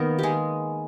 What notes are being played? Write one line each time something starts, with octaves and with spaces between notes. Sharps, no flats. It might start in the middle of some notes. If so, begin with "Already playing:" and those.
Already playing: D#3 A#3 B3 A#4
G#3 G4 G#4